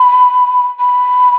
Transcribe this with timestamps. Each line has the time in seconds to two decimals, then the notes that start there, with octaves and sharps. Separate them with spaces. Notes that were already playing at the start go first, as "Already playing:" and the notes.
Already playing: B5
0.79 B5